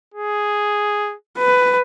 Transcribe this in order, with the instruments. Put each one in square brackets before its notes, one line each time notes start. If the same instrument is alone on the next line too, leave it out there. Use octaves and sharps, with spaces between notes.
[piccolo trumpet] G#4
[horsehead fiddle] B4